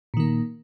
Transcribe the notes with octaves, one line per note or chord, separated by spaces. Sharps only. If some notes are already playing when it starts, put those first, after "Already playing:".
A#2 D#3 A#3